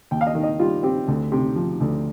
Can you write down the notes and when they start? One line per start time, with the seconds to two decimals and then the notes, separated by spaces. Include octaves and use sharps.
0.11 D#2 G5
0.21 F5
0.27 D#5
0.35 D#3
0.43 D#5
0.59 G3 F4
0.83 C4 G4
1.08 D2
1.32 C3
1.56 F3
1.80 D2